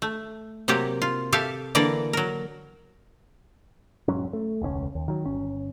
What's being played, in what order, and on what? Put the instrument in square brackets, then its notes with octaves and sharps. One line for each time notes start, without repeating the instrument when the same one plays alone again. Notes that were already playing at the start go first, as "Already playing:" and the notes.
[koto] A3
C3 F#3 A#3 G4
F4
G4 A4 E5 F5
D3 E3 A#3 A#4 D5
F#3 A#4
[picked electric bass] E1 G#2 F#3 C#4
A3
E1 C#2 C4 C#4
D#2
D#3 F#3
G1 C#4